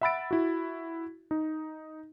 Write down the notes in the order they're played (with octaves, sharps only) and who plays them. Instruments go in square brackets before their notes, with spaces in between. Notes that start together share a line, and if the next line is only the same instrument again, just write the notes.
[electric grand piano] E5 F#5 B5 E6 A6 D7
E4 F#4
D#4